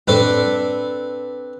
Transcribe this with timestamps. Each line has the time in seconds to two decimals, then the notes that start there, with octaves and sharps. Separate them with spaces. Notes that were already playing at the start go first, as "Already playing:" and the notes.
0.07 F#2 A2 G3 C4 D4 A4 B4